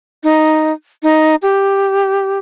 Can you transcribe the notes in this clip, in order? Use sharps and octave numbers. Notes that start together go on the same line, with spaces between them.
D#4
D#4
G4